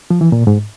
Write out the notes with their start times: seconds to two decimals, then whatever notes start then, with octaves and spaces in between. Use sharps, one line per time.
0.10 F3
0.21 E3
0.32 A#2
0.47 G#2